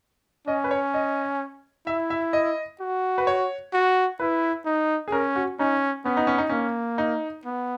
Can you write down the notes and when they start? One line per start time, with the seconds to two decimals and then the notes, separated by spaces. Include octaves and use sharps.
0.47 C#4 D#5
0.64 B4
0.71 C#5
0.94 D#5
1.87 E4 E5
2.10 E5
2.33 D#5
2.80 F#4
3.18 B4
3.27 C#5
3.74 F#4
4.20 E4 B4
4.65 D#4
5.08 G#4
5.12 C#4 A#4
5.36 F#4
5.59 C#4 D#4
6.05 B3 C#4
6.17 D#4
6.27 C#4
6.38 D#4
6.49 A#3 C#4
6.98 D#4
7.45 B3